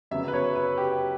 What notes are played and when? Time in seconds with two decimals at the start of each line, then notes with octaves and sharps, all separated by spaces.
0.11 F#2 C#3 F#3 B3 E5
0.28 B4
0.33 C#5
0.56 B4
0.78 G4